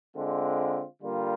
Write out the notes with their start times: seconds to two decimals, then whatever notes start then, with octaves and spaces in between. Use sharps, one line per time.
0.15 D3 G#3 C4 F4
1.02 D3 G3 A#3 F4